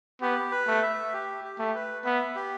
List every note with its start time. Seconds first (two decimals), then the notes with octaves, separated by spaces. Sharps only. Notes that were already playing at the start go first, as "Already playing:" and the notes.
0.21 B3 G4
0.52 B4
0.67 A3
0.82 E5
1.13 G4
1.44 G4
1.59 A3
1.75 B4
2.05 B3 E5
2.35 G4